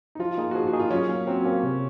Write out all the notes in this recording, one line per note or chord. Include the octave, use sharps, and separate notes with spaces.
D#4
F3 F4
A#3 D#4 G#4
F#4
F3 G#4
F#4
A#3 D#4 G#4
F4
F#3 C#4
A#3 C#4
F#3 C4
A#3 C#4
C3